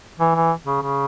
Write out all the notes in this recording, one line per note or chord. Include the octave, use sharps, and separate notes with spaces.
E3
E3
C#3
C#3